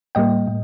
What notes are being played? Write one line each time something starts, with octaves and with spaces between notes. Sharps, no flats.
A2 G3 A#3 D#5 G5
A2